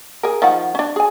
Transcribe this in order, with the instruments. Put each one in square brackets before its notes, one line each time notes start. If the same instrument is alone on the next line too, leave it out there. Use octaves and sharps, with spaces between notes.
[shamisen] G#4 A#4
D#3 F3 F#5
C#4 D4
G#4 G#5